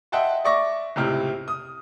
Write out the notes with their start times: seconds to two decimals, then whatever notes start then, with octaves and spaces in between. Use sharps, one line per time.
0.12 D#5 E5 F#5 G5 A5 C6
0.44 D5 E5 C#6 D6 A#6
0.96 C#2 A2 C3 E4 G5 F6
1.48 D#6